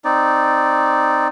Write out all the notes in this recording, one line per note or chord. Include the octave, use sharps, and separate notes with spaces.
C4 D#4 D5